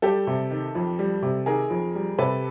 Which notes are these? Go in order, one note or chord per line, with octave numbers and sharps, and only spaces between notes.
G3 G4 A4
C3
D#3
F2
G3
C3
D#3 G#4 A#4
F2
G3
C3 A4 B4